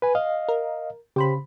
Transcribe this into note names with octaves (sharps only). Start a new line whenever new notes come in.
B4 G#5
D#5 F5
A#4
C#3 G4 C5 B5